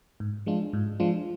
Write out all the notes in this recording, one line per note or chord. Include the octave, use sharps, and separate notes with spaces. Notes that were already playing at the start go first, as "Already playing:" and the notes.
G#2
F3 G#3 D4 F4
G#2
F3 G#3 D4 F4